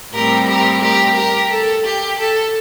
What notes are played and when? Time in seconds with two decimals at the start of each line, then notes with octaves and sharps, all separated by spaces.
0.13 A2 G3 C4 G4 A#4
0.47 G4 A#4
0.81 G4 A#4
1.16 G4 A#4
1.51 A4
1.85 G4
2.18 A4